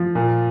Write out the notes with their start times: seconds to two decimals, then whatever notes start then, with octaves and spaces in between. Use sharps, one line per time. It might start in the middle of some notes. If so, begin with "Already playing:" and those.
Already playing: F3
0.15 A#2